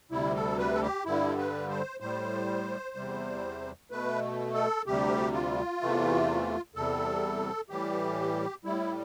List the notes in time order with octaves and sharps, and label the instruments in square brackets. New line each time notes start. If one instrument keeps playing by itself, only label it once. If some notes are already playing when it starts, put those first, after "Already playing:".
[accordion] D2 C3 G3 E4
A4
B4
A4
G4
G2 D3 G3 E4
B4
C5
A2 G3 C5
E2 C3 G3
B2 A3 B4
A4
D2 C3 G3 G4
F4
E2 C3 E3 A3
E2 C3 G3 A4
A2 E3 G3 G4
A2 G3 E4